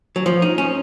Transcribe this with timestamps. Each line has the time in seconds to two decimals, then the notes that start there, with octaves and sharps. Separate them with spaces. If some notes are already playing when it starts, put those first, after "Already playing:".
0.16 F#3
0.26 F3
0.42 D#4
0.58 C#4